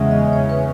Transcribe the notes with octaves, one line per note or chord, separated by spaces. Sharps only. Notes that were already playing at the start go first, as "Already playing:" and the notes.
Already playing: E2 C#3 G#3 C#4 E5 F#5
D#5
D#5
C#5
B4